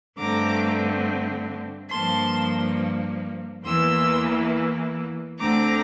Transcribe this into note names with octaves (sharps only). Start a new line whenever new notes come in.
G2 D3 A3 C4 A#5 D6
G2 F3 A#3 A5 C6
E2 E3 A#3 C6 E6
D2 D3 A3 C4 A#5 D6